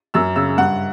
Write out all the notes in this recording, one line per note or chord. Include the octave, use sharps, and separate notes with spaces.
F#2 E6
C#3 E6
G2 F#5